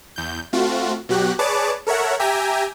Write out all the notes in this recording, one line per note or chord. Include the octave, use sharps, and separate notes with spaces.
E2 G6
A3 C4 F4 F#4
B2 F#3 F#4 G4 F#6
G#4 B4 C#5 D5 A5 D6
A4 A#4 C#5 E5 F#5
G4 E5 G5 G#5 A#5